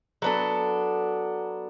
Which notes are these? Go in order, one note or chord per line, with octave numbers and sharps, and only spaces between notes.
F#3 B3 D4 A4